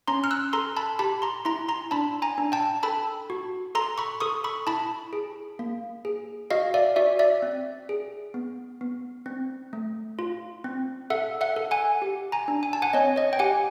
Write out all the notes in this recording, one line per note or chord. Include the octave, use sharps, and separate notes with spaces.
C#4 A#5 C6
F6
E6 F#6
A4 A#5 C6
A5 B5
G4 A5 B5
A#5 C6
E4 A#5 C6
A#5 C6
D4 A5 B5
G#5 A#5
D4
G5 A5
A4 A5 B5
F#4
A4 A#5 C6
B5 C#6
A4 C#6 D#6
B5 C#6
E4 A5 B5
G#4
A#3
G#4
F#4 D#5 F5
D5 E5
F#4 D5 E5
D5 E5
C4
G#4
B3
B3
C4
A3
F4
C4
A4 E5 F#5
E5 F#5
A4
F#5 G#5
G4
G#5 A#5
D4
G#5
A5
F#5 G#5
C4 C#5 D#5
C#5 D#5
G5
G4 F#5 G#5